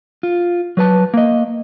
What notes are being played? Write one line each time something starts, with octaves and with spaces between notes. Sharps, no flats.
F4
F#3 B4 A5
A#3 D#5